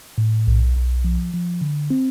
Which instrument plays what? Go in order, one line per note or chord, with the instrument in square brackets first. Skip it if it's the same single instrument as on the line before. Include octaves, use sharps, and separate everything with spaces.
[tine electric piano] A2
B1
B1
F3
F3
D3
C4